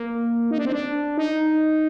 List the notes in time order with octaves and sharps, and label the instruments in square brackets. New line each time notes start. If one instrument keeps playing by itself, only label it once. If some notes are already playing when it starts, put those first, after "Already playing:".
Already playing: [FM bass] A#3
D#4
D4
C4
D4
D#4